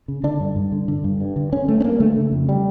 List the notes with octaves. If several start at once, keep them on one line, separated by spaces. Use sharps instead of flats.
C#3
D3 D4
G2
G2
D3
D3
G2
G2
D3
D3 C#4
G2 A3
C#4
G2 A#3
D3 A3
C#3
F2
G3